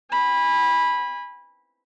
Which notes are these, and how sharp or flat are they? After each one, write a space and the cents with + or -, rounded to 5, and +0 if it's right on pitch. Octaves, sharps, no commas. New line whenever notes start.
G#5 -30 B5 -10